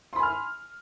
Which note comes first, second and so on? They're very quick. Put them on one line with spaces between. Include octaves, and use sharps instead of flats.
C6 B5 G#5 F6